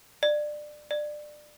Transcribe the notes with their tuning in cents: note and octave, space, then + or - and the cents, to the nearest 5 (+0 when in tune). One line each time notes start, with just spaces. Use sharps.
D5 +20
D5 +20